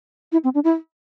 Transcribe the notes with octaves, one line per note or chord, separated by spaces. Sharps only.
E4
C4
D4
E4